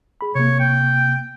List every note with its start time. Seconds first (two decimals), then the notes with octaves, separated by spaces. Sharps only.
0.21 G#4 B5
0.35 C3 A#3 C#5
0.60 G5